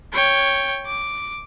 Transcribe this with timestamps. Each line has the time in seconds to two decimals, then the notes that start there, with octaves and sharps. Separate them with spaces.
0.13 C#5 G5
0.87 D6